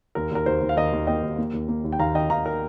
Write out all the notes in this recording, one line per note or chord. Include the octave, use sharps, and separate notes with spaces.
D#2 A#4
D#2 A#4
D#2 C5
D#2
F5
D#2 A#4 D#5
D#2
A#3 D#5 G5
D#2
A#3
D#2
A#3
D#2
G5
D#2 F5 A#5
D#3 D#5 G5
D#2 F5 A#5
A#4